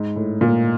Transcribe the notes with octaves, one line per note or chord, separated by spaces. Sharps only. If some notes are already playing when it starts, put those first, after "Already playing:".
Already playing: G#2
A2
A#2